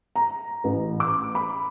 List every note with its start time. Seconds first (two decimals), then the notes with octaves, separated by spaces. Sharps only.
0.16 A#5
0.64 A1
1.00 D6
1.35 B5